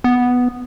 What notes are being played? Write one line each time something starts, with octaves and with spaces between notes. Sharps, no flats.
B3